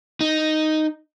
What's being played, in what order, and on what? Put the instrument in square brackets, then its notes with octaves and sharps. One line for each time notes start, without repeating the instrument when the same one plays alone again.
[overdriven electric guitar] D#4